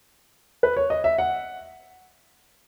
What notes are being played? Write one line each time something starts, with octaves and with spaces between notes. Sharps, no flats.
B4
C#5
D#5
E5
F#5